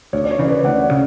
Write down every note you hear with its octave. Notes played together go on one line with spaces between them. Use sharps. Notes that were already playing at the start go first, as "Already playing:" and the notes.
D2 C#5
D5
C#5
C#3 E3
B4 D5
D2 D5 F#5
C#3